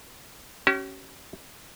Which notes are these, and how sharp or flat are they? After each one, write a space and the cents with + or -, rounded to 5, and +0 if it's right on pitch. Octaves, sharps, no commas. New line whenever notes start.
C#4 +0 G4 -45